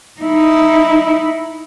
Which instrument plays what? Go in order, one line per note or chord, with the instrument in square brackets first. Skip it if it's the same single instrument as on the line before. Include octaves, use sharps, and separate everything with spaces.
[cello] D#4 E4